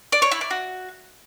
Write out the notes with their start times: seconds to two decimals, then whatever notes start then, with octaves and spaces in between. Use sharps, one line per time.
0.12 D5
0.22 C#5
0.31 E4
0.41 D5
0.51 F#4